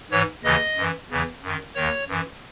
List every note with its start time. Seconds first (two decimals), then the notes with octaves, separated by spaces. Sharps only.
0.11 G#2 E3 C#5
0.44 D#2 C#3 E3 D#5
0.77 F#2 E3
1.10 E2 C#3 E3
1.43 F#2 D#3
1.75 D#2 D#3 C#5
2.08 F#2 E3